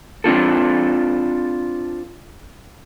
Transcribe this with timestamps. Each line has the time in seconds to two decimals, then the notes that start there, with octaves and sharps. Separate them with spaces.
0.24 C4 D4 F4 A4